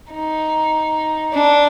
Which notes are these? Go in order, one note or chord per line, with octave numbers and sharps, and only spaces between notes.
D#4
D4